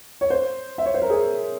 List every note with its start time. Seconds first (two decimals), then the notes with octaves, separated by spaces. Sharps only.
0.21 C#5
0.30 C5
0.78 E5
0.86 C#5
0.94 C5
1.02 A#4
1.10 G#4